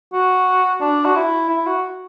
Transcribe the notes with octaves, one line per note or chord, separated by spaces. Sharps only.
F#4
D4
F#4
E4
E4
F#4